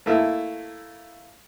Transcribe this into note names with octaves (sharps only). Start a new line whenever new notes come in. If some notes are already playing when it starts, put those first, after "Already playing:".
A3 A#3 E4